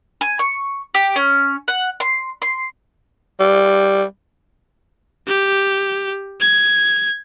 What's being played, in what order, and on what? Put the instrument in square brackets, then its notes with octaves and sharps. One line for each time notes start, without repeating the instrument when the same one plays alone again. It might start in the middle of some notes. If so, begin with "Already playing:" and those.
[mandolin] G#5
C#6
G4
C#4
F#5
C6
C6
[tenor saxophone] G3
[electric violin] G4
G#6